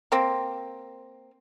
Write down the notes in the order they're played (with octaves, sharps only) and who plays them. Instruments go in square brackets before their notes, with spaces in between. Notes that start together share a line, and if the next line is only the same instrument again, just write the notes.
[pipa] A#3 C4